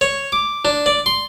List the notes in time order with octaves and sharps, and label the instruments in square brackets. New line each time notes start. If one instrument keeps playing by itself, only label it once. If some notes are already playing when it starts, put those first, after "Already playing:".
[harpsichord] C#5
D6
D4
D5
C6